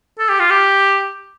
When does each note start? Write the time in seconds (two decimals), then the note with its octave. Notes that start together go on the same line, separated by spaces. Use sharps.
0.19 A4
0.30 G4
0.40 F4
0.51 G4